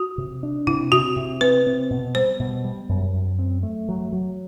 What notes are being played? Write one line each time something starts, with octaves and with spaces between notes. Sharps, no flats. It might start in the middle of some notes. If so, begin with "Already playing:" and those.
Already playing: F#4
C3
D4
C3 E4
C3 F#4
C3
C4 B4
C4
B2
G3 C5
B2
G3
F#2
F#2
C4
A3
F#3
F#3